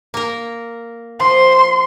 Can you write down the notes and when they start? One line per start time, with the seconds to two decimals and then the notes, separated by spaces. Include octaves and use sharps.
0.14 A#3 A#4
1.20 F3 C6